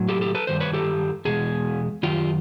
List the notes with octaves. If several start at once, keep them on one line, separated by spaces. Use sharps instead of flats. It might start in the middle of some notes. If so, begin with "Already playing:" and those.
Already playing: A2 F#3
G4 A4
G4 A4
A4 B4
G2 D#3 C5
B4 C#5
G4 A4
E2 B2 G#3 G#4
F#2 D#3 F4 G4